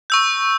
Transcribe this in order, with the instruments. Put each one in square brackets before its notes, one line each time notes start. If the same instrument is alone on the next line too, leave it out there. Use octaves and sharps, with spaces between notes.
[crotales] C#6 E6 G6